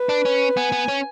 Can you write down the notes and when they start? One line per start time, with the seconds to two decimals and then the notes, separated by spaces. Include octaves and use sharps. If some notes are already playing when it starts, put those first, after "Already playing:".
Already playing: B4
0.09 D4
0.25 C#4
0.57 B3 G#5
0.72 B3
0.88 C#4